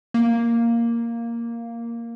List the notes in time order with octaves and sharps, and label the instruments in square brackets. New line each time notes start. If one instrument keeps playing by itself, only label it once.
[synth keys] A#3